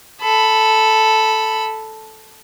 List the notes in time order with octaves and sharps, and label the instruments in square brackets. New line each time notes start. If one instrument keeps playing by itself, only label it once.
[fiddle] A4 B5